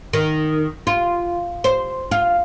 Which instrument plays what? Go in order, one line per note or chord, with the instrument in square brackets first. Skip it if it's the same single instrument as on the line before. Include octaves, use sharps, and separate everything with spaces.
[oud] D#3
F4
C5
F4